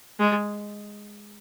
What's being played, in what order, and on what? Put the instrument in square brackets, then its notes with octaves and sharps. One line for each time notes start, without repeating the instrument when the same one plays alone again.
[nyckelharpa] G#3